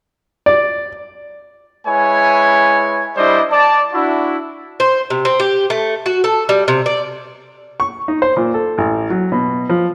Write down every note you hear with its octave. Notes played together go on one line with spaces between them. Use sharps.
D5
G#3 E4 B4 C#5 G#5
G3 D4 E4 C5 D5 D#5
D5 A5
D4 E4 F#4
C5
C3
C4
G4
A3
F#4
A4
G3
C3
D5
C#6
D#4
C5
A#2
A4
A1
F#3
B2
F3